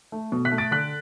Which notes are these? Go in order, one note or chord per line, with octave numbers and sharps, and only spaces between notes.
A3
B2
F#6 B6
A3
A6 D7
D3 F#6 B6